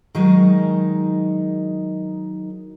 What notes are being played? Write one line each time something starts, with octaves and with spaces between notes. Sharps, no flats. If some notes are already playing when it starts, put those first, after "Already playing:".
D#3 F#3 G#3 D#4 G#4 A#4